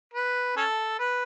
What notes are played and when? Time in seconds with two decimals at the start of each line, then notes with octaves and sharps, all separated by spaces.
0.14 B4
0.56 C#4 A4
0.99 B4